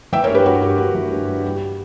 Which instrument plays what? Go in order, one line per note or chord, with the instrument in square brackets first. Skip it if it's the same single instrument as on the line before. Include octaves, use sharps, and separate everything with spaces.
[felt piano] E3 E5 G5
A#4 C#5
G2
G4 B4
G2 F#4 A#4
G2 G4
G2 F#4
E3
G2
G3
G3